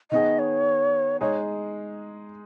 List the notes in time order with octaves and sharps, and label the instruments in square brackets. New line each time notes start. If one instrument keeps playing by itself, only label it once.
[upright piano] D#3 B3 G#4 [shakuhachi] D#5
[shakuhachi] C#5
[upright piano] G#3 D#4 G#4 [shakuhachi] C#5